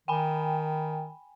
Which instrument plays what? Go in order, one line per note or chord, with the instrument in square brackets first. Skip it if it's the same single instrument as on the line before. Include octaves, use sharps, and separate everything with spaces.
[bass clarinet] D#3 [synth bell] G5 G#5 B5